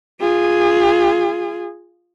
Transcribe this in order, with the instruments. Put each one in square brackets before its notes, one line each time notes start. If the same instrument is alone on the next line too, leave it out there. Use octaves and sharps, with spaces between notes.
[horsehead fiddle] F4 G#4